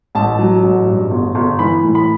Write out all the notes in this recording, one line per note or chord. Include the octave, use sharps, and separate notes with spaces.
A1 A5
F#3
A1
G2
G1
G1
E3 B5
A2
B5